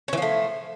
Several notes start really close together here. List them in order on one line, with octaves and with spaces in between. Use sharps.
C#4 E3 F3 A3